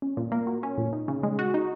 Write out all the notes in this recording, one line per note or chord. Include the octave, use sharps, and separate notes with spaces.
C#4
A#2
A#3
F#4
C#4
A#2
D#4
C#3
G#3
F#4
D#4